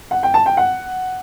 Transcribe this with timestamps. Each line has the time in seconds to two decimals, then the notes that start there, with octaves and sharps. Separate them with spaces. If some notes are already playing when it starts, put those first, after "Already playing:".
0.11 F#5
0.23 G5
0.34 A5
0.46 G5
0.57 F#5